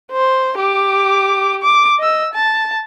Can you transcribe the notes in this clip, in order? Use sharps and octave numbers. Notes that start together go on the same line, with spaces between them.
C5
G4 D6
D6
D#5 E6
A5